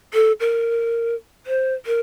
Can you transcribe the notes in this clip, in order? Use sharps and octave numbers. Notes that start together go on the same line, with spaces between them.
A4
A#4
C5
A#4